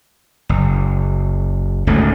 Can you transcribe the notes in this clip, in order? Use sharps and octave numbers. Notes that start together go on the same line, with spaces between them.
F#1
D1 C#2 G#2 A3